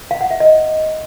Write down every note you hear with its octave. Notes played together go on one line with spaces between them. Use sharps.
F5
F#5
E5
D#5